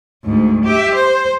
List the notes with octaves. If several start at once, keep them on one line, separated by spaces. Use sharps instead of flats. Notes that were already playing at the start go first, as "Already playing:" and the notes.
D2 G#2
G4 E5
C5